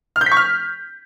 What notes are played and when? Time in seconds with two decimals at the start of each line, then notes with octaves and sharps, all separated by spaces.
0.16 F6
0.21 G6
0.26 B6
0.32 C#6
0.37 F6